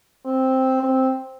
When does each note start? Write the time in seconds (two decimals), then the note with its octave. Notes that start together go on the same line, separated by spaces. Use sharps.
0.26 C4
0.83 C4